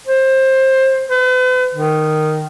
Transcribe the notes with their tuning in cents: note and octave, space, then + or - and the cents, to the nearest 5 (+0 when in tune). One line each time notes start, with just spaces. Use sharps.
C5 +20
B4 +45
D#3 -10